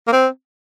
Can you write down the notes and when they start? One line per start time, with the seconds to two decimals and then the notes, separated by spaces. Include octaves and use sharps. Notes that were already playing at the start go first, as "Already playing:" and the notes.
0.08 A#3
0.12 C4